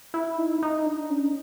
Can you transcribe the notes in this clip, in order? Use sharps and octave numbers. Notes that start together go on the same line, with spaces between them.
E4
D#4
D#4
D4
C#4